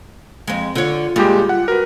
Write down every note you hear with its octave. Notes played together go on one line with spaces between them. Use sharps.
F2 G#3
D3 F4 C#5
A#2 G3 G#3 G4
F#5
F#4 A#4 B4